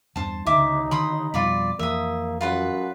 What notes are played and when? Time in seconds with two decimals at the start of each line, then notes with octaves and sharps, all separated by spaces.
0.16 E2 G2 D4 C5 A5
0.46 C#2 D3 D#4 E5 D6
0.91 D3 D#3 B5 C6 D#6
1.34 F2 B2 G3 F4 D5 B5
1.79 F2 E3 A#3 E5 D#6
2.41 F#2 F4 B4 F#5